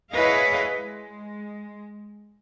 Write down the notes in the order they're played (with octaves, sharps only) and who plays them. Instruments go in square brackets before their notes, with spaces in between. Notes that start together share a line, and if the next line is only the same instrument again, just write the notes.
[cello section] E4 G#4 B4 C#5 D#5 F5
G#3